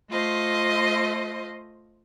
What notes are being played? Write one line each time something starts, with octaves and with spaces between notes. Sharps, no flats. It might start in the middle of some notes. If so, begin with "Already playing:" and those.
A3 F4 C5 D#5